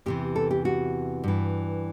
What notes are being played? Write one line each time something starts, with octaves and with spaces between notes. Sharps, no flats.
E2 C3 E3 G4
A4
G4
F#4
G2 E3